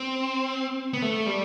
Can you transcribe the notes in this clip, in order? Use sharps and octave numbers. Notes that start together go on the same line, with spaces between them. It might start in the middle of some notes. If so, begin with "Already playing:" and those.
Already playing: C4
B3
A3
G3